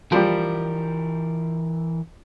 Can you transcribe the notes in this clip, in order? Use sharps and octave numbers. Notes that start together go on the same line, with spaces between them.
E3 F3 G3 G4 A#4